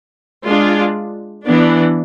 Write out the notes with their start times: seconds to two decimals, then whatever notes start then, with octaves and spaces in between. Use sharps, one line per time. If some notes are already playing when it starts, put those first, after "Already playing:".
0.46 G#3 D4 F4
1.45 E3 B3 D4